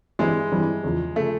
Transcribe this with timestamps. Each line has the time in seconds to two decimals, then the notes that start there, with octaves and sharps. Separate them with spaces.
0.19 G2 E3 G3 G#3 C4 E4
0.51 G2 E3 G3 C4 E4
0.84 E2 C#3 F3
1.16 C#3 F3 A3